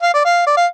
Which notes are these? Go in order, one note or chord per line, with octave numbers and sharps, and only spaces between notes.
F5
D5
F5
D5
F5